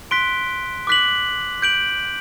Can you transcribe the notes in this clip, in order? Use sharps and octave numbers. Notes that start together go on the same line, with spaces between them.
C6 F#6 B6 D7 G7
D6 F#6 B6 F#7
G6 D7 F#7